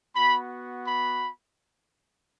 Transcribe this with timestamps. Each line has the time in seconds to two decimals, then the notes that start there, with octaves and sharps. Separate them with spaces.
0.16 B3 F#4 B5
0.87 B5